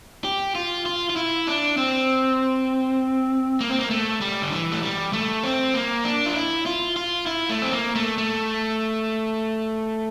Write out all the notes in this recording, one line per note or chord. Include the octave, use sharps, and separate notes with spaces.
G4
F4
F4
F4
E4
D4
C4
A#3
C4
A#3
A3
G3
D3
E3
A3
G3
A3
C4
A#3
D4
F4
E4
F4
F4
E4
A3
C4
A#3
A3
A3